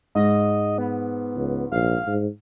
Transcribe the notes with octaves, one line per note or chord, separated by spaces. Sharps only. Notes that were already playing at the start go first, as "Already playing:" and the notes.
G#2 D#5
B3
C#2
A#1 F5
G#2